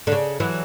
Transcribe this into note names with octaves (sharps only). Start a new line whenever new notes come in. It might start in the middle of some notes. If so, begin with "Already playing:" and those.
D3
C#3
E3 F#3